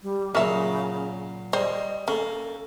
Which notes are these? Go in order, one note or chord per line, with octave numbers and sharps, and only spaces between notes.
G3
A#2 C#3 F#3 C#4 E5
G3 C5 D#5
A#3 C#4 A4